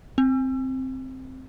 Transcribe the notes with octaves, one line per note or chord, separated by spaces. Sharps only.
C4